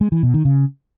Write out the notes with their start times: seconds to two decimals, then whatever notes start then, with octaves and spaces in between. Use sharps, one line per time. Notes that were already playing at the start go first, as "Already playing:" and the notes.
0.01 G#3
0.12 E3
0.23 B2
0.34 D#3
0.45 C#3